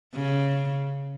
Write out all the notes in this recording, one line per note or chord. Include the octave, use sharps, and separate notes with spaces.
C#3